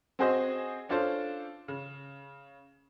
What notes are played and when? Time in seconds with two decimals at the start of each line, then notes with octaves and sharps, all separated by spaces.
0.19 C4 F#4 G#4 C5 D#5
0.89 C#4 D4 F4 A4 C5
1.68 C#3